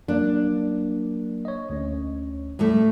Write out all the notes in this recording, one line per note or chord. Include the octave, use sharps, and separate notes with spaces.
F#3 A#3 D4
C#5 D#5
D2 C#4
A2 G3 A3